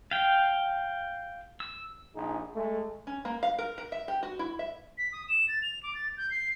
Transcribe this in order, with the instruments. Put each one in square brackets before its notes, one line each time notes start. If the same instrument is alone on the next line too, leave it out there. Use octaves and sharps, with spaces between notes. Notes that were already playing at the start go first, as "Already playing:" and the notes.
[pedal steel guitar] F5 G5
E6
[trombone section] A#1 D#4 G#4
G#3 A3
[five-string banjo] C#4
A#3
F5
A#4
A#4
E5
G4
F#4
E4
E5
[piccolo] B6
D#6
E7
A6
F7
D6
A6
G6
C7